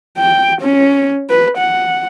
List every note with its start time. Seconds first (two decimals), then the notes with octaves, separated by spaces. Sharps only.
0.18 G5
0.62 C#4
1.30 B4
1.58 F#5